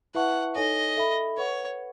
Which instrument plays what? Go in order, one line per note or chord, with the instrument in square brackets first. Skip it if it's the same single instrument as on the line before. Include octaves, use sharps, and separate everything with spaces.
[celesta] E4 B4 E5 A5 C#6 [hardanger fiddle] F#5
[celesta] D#4 A4 C#5 G#5 [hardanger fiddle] D#5
[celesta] A4 E5 B5
[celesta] B4 F#5 C#6 [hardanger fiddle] C#5